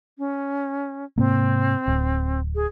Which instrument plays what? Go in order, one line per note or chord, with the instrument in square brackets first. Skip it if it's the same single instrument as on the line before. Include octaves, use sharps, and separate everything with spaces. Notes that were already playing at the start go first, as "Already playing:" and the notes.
[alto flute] C#4
[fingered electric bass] G#2 C3 A#3 [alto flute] C4
[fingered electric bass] D1
[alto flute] G#4